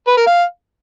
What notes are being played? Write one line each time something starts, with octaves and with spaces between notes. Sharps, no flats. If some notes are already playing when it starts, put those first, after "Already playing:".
B4
A#4
F5